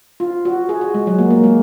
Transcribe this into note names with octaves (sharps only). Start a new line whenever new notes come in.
F4
F#4
G#4
F#4
G#3
F#3
A#3
A#3
G#3